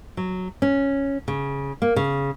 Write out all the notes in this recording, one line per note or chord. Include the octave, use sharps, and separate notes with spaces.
F#3
C#4
C#3
A#3
C#3